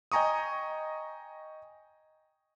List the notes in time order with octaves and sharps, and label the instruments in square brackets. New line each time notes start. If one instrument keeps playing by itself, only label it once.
[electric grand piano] D#5 G5 G#5 A#5 C#6 D#6